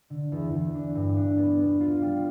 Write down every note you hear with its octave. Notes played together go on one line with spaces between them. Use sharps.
D3
E2
E2
D4
G2
D4
B3
B3
F4
G3